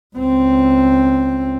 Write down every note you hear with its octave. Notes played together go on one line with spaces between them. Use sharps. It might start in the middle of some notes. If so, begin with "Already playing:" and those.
C#2 C4